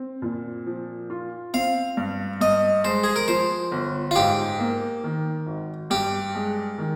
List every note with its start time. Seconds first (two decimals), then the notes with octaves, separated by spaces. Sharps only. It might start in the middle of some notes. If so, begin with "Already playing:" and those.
Already playing: C4
0.22 A#2
0.67 F3
1.10 F4
1.54 C4 F5
1.97 G2
2.41 G2 D#5
2.84 G#3 C5
3.04 G#4
3.16 A#4
3.28 F3 C5
3.72 G1
4.11 F4
4.16 G#2 G4
4.59 A#3
5.04 D#3
5.47 G#1
5.90 G2 G4
6.35 G#3
6.78 D#3